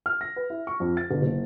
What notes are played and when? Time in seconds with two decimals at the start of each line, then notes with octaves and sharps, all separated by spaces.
0.06 F6
0.21 A#6
0.36 B4
0.50 E4
0.67 C#6
0.80 F2
0.97 A6
1.11 G1
1.22 F#1